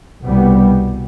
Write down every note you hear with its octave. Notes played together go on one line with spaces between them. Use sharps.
C2 B2 G3 B3